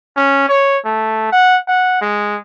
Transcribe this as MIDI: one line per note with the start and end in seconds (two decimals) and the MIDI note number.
0.16 0.47 61
0.49 0.78 73
0.85 1.28 57
1.32 1.57 78
1.68 2.00 78
2.01 2.37 56